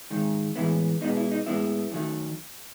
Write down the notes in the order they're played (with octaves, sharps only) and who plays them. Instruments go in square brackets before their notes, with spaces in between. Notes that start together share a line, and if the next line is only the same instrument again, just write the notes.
[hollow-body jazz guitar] G#2 D#3 G#3
A2 E3 G#3 B3 E4
B2 G#3 B3 D#4
E4
D#4
A2 G#3 B3 E4
F#2 D#3 F#3 A3